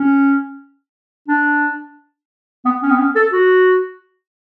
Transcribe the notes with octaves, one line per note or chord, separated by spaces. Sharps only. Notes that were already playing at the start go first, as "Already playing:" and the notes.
Already playing: C#4
D4
B3
C#4
B3
C#4
A4
F#4